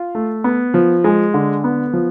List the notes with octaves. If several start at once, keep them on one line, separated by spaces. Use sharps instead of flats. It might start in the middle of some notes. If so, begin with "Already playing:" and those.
Already playing: F4
A3
B3
F3
G#3
D3
B3
F3